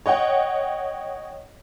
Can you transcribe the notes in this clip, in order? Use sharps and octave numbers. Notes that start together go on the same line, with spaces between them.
C#5 D#5 F#5 G5